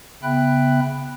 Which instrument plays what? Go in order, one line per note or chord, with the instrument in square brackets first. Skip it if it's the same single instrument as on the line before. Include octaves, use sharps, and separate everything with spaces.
[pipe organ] C#3 B3 E5 G5 B5 F#6